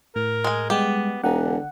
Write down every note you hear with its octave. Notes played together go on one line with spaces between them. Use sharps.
A2 A#4
G#3 G#5
G3 G#3 B3 G4
E1 D#4 F#5
D3